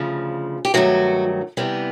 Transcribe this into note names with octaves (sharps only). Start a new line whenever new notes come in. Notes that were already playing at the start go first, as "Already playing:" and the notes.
Already playing: D2 C#3 F3
G4
G2 D#3 F#3 A3 F#4
C3 E3 G3 B3